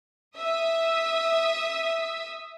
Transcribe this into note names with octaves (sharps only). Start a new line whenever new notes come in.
E5 D#6